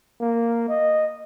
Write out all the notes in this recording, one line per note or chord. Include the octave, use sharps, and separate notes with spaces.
A#3
D#5